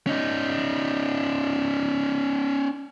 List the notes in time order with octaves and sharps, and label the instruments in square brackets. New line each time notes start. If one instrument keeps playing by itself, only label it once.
[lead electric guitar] C#4 D#4